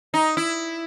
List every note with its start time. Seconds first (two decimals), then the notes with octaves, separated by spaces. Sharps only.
0.14 D#4
0.37 E4